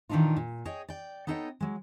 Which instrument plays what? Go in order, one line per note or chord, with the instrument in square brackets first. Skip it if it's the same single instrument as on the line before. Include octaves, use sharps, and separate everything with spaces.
[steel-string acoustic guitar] A#2 D#3 E3 D4 D#4 F4
A#2
G#4 C#5 D#5 G5
D5 G5
B3 D#4 A4 C#5 D#5 G5
F#3 G#3